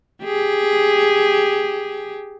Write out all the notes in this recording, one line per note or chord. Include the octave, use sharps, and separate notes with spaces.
G4 G#4